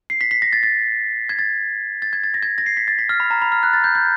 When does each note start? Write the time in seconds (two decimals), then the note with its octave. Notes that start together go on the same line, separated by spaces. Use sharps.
0.10 C7
0.21 B6
0.31 B6
0.42 A#6
0.53 A6
0.63 A6
1.29 G#6
1.39 A6
2.02 A6
2.13 G#6
2.24 A6
2.34 A#6
2.43 G#6
2.58 A#6
2.66 C7
2.77 B6
2.88 A6
2.99 B6
3.09 F6
3.20 B5
3.31 A#5
3.42 B5
3.52 F6
3.63 F#6
3.73 A6
3.84 G6
3.95 G6